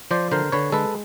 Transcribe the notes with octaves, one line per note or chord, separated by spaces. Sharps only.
F3 C5 D5
D3 A#4 C5
D3 B4 C#5
G#3 A4 B4